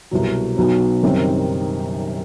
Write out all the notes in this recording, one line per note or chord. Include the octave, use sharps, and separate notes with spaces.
C2 B2 F#3
B1 B2 F#3 B3
F#1 F#2 D#3 G3 C4